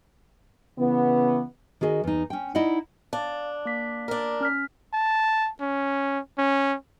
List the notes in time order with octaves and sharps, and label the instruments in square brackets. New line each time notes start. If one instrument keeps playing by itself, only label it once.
[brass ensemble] C#3 E3 B3
[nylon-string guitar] D#3 F#4 G#4 D#5
E2 D#4
C#4 G5
D#4 E4 D5 D#5 F#5
[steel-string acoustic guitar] D4 [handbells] F5 A5
[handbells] A#3 D6 B6
[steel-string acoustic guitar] D4 A#4
[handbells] C#4 F6 B6
[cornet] A5
C#4
C#4